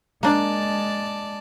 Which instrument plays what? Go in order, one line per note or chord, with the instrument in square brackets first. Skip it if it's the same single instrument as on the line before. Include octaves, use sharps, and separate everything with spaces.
[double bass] G#3 [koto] A#3 D4 [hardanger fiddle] D5 A5